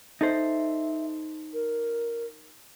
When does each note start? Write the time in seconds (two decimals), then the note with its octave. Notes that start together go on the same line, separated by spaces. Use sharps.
0.21 D#4 A4 C5 E5
1.53 A#4